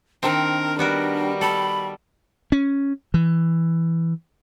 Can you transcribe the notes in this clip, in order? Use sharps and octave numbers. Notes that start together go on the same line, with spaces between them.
D#3 C4 D4 A#4
G3 B3 F#4 A#4
A4 B5
C#4
E3